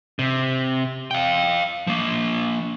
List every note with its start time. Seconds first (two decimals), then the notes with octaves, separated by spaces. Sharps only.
0.19 C3
1.11 F5 G5
1.87 F3 A#3